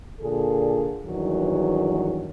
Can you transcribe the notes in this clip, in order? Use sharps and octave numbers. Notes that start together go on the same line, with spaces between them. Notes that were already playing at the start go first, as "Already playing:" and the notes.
A#2 D3 G#4 A4
E2 G2 D#3 F#3